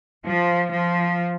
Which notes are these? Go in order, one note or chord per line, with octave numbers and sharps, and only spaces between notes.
F3
F3